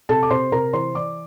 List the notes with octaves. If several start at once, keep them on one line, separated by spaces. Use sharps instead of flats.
C3 A4 A5
D6
C3 C5 C6
C3 A#4 A#5
E3 C5 C6
E3 D5 D6